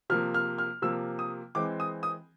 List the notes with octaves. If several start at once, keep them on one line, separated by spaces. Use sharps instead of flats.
C3 F3 A#3 F6
F6
F6
C3 F3 A#3 E6
D#6
E3 G#3 C4 D6
D#6
D#6